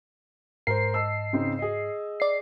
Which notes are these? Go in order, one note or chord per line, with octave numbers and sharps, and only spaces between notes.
G#2 A#4 C5 C7
D#5 A5 E6
C#3 C4 D#4
G#4 D#5
D5 C7